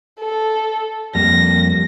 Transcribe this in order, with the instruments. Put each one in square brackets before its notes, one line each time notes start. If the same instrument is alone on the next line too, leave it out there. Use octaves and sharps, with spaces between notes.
[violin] A4
[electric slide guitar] F2 G3 A#3 [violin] A#6